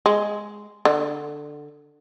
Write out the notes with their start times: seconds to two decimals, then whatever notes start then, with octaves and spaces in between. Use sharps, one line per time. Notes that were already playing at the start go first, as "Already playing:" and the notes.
0.06 G#3
0.85 D3